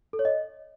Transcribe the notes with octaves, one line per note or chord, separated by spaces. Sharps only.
A4
C#5
D#5